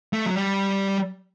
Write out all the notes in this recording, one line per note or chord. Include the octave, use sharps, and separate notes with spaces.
A3
F#3
G3